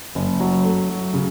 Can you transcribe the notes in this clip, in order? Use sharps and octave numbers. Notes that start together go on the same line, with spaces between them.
F#1
F#3
A3
F#3
C#3